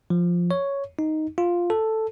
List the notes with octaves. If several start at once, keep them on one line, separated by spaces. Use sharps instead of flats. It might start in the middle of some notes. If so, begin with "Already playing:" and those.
F3
C#5
D#4
F4
A4